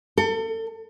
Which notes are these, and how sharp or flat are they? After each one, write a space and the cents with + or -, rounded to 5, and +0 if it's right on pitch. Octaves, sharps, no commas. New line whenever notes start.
A4 +35